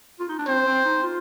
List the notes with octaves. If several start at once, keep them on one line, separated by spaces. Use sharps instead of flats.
F4
D#4
D4
C4 C5
C4
D#4
F4